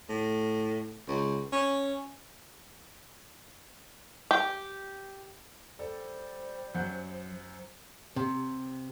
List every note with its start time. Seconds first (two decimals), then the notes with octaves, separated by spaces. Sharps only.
0.09 A2
1.07 C#2
1.52 C#4
4.31 G4
5.79 G3 A4 C5
6.74 F#2 F#3 F#5 G6
8.16 C3